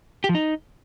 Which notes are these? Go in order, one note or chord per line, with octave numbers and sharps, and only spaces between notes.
G4
F3
D#4